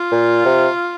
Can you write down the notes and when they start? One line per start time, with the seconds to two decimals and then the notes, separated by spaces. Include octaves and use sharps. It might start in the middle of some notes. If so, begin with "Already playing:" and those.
Already playing: F4
0.12 A#2
0.45 C3